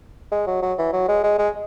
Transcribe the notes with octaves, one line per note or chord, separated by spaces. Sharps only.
G#3
F#3
F#3
E3
F#3
G#3
G#3
G#3